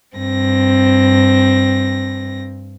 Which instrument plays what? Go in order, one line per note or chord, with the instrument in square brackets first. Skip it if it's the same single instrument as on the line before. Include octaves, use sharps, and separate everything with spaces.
[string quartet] G2 C4 A#6